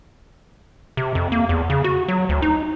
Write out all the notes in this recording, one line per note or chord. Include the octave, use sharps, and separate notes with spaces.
C3
F2
A#3
E2
C#3
F#4
F#3
D2
D#4